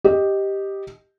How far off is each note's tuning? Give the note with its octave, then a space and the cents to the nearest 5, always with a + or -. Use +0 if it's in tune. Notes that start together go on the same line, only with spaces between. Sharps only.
G4 +0 D#5 +0